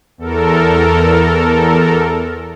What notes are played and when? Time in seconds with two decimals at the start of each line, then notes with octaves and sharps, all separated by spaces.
0.18 E2 A4 A#4